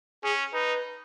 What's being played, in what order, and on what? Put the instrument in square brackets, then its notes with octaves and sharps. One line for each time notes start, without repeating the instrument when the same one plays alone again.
[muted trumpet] C#4 [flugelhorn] G#4
[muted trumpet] D#4 [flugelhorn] B4